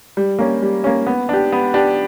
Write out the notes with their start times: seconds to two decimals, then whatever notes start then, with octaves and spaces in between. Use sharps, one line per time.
0.17 G3
0.39 A#3 C#4
0.62 G3
0.84 A#3 C#4
1.07 B3
1.29 D4 G4
1.53 B3
1.74 D4 G4